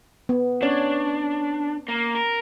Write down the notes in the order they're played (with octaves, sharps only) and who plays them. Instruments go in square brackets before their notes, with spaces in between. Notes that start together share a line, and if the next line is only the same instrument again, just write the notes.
[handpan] B3
[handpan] C#4 C#5 [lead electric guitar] D4
[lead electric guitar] A#3
A#4